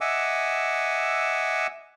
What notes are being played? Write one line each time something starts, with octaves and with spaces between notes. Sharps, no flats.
D#5 E5 F#5 G#5 D6 E6